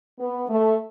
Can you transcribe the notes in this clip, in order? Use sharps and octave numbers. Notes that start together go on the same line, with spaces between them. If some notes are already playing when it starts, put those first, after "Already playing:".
B3
A3